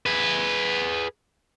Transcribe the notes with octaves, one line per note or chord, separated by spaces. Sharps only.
G#4 B4